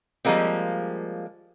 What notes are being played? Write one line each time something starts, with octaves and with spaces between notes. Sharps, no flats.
F3 G3 G#3 A#3 C4